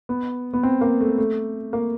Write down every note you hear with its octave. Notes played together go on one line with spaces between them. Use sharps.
B3
B3
C4
A#3
A3
A3
A#3